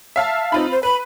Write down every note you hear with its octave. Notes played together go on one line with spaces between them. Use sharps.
E5 F5 A5
C4 D#4 F4 B5
C5
B4 B5